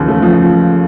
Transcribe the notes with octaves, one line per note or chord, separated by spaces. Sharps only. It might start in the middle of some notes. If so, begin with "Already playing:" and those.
Already playing: D#2 C#3 E3 F3
A3
F3